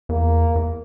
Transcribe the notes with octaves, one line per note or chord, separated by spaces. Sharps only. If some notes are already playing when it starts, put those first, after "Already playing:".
E2 A#3
E2